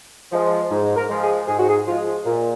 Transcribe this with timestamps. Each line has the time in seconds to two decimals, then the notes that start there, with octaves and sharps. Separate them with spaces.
0.32 F3 G#3
0.70 G#2
0.96 A#4
1.09 F3 G#3
1.22 G#4
1.48 G#2 G#4
1.58 F#4
1.68 G#4
1.87 F3 G#3 F4
2.26 A#2